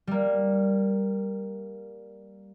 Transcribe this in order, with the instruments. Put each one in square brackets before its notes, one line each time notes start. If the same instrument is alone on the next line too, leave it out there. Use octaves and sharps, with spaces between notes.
[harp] G3 A#3